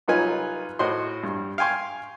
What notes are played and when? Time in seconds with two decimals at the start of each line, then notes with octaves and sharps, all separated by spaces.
0.08 C2 F#3 D#4 F4 B4 G#5
0.79 A2 F#4 C5 D#5 C6
1.23 G2
1.58 F5 G5 G#5 C6 C#6